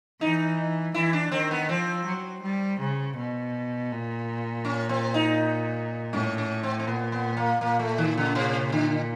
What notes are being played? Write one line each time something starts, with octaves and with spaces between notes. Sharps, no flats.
E3 D#4
E3 E4
D4
D#3 C4
B3
F3 C4
F#3
G3
C#3
B2
A#2
C#4
C4
D#4
A2 C#4
C#4
C4
C4
A#2 B3
B3
A#3
A#2 A#3
A3
D#3
C#3
C3
D3